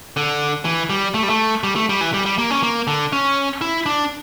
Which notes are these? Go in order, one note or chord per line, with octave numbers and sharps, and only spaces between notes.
D3
E3
G3
A3
G3
A3
G3
A3
G3
E3
G3
G3
A#3
C#4
A#3
D3
C#4
E4
D4